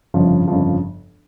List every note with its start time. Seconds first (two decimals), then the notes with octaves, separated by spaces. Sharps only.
0.14 G1 F2 C#3 F3
0.48 G1 F2 C#3 F3